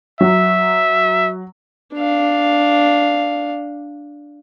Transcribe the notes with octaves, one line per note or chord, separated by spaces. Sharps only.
F#3 E5
D4 F5